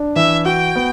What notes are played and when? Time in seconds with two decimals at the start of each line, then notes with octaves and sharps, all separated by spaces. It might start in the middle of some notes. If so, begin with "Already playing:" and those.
Already playing: D4
0.16 E3 E5
0.45 F#4 G5
0.76 B3